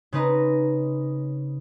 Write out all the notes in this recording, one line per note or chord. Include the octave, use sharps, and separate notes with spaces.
C#3 C4 D#4 B4 D#5 A#5